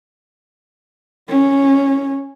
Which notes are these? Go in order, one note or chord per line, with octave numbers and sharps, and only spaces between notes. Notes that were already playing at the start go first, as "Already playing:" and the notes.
C#4